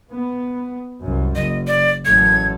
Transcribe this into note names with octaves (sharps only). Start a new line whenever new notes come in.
B3
C2 F#2
F#1 D#5
D5
A1 F#2 A3 G#6